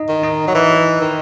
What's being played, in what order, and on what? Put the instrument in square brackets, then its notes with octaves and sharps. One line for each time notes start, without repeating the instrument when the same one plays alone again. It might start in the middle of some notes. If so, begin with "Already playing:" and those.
Already playing: [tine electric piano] D#4 D#5
[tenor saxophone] D#3
[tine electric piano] D#4 D#5
[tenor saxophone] F#3
E3
D#3